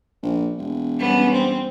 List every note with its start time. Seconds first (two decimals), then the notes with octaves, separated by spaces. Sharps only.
0.22 A#1
0.58 E1
0.98 G3 B3 C#4
1.32 C4